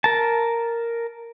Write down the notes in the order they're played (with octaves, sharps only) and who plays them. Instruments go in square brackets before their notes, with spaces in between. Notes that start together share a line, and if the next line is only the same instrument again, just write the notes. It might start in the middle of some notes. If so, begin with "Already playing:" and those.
[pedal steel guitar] A#4 A5